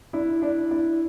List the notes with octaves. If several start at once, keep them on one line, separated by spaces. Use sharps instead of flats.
D4 E4
D4 E4
D4 E4